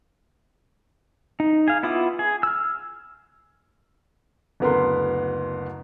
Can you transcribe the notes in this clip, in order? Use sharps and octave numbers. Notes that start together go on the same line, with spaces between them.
D#4
G#4 F5
B3 E4 F4 D6 D#6
G#4
E6 F6
F#1 D2 B3 A#4 B4 C6